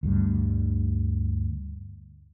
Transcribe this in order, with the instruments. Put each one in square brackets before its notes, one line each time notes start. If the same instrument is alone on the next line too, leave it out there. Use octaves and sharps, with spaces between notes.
[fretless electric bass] D2 G2 D3